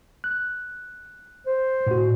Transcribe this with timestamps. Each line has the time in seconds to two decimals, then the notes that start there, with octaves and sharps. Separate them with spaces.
0.24 F#6
1.47 C5
1.87 A2 F#4